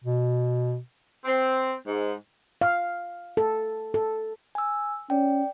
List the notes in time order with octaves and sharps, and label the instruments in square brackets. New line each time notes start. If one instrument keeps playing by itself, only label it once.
[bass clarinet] B2
[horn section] C4
G#2
[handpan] F5
A4
A4
[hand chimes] G#5 E6
[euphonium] C#4 [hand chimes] D5 G5